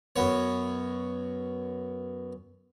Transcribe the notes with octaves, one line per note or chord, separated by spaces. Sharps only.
F#2 B3 C#5